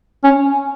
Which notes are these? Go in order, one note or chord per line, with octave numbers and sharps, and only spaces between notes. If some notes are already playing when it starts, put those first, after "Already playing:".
C#4